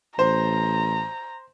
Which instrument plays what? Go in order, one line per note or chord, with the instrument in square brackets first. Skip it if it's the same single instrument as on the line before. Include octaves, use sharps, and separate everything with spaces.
[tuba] A1 [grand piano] C5 [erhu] A#5